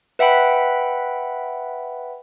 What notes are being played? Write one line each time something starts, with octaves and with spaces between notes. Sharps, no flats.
B4 E5 F#5 G5 B5